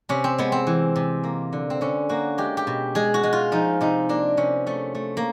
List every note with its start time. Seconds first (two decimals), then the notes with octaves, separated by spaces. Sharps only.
0.09 C3 C#4
0.24 C4
0.38 G#3 B3
0.52 C4
0.67 E3
0.96 C3
1.24 A#3
1.53 D3
1.70 C4
1.81 D3 C#4
2.09 A#3 F#4
2.38 G#3 G4
2.57 G4
2.67 B2
2.95 G#3 G#4
3.14 F#4
3.23 G#3
3.33 F4
3.52 F3 D#4
3.81 C3 D#4
4.09 A#3 D4
4.37 C3 C#4
4.67 A3 C#4
4.95 A3
5.17 A#3